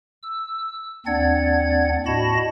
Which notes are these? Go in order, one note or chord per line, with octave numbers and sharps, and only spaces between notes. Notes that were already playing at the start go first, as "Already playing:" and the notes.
E6
D#2 C4 D4 D5 F#5 G#6
A2 F#4 D#5 A5 B5 A#6